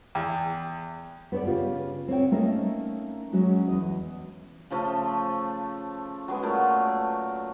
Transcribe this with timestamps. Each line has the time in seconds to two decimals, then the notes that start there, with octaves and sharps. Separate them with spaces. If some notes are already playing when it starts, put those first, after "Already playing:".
0.15 E2 G5
1.32 B3 C5 D5
1.45 C#3 F4 G4
2.08 C4 F4 C#5 G5
2.31 A3 A#3 C#4 D#4 D#5 E5
3.33 F#3 G#3 C#4 F#4
3.68 E2 D#5
4.70 C#3 F3 A3
6.28 F#3 G#3 B3
6.43 A#2 A3 A#4